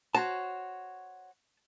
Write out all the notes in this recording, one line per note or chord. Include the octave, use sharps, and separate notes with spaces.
F#4 C5 C#5 A5